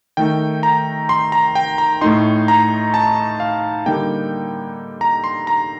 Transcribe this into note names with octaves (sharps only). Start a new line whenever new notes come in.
D#3 A3 D#4 G5
A#5
C6
A#5
G5
A#5
A2 A3 D#4 C6
A#5
A5
F5
D3 G3 A#3 D#4 G5
A#5
C6
A#5